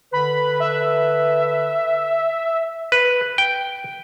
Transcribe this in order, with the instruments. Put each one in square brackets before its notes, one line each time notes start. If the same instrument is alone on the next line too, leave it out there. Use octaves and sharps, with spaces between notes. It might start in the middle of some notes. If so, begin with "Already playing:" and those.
[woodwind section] D3 B4 [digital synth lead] B5
[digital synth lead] E5
[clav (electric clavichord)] B4
G5